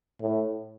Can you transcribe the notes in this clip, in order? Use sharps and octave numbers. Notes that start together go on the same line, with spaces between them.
A2